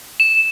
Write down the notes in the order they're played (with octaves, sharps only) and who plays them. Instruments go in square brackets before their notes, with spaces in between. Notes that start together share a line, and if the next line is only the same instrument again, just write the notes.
[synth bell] E7